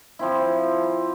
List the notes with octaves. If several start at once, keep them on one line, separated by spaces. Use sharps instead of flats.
F3 C4 E4